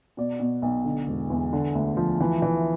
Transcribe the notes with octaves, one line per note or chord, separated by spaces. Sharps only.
B2 D5
B2
B1
D3
E1
E2
D3
D2
F3
E3
E3